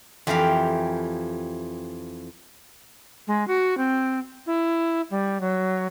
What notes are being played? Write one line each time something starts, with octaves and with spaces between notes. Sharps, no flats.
F2 E3 F3 G4 A#4 F5
G#3
F#4
C4
E4
G3
F#3